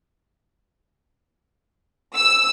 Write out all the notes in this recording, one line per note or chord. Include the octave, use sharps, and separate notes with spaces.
E6